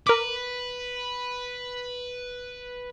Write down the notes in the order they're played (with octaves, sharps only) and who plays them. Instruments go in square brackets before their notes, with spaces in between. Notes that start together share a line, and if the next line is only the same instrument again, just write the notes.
[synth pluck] A#4 D6 [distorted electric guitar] B4